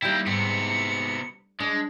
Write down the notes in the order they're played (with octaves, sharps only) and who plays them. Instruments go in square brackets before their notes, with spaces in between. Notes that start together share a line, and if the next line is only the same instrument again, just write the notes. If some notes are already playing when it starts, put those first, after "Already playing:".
[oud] D#3 G3 [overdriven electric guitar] A#3 E4 [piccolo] G5
[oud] G#2 [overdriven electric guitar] C3 B3 [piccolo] C#7
[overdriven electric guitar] G#3 [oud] D4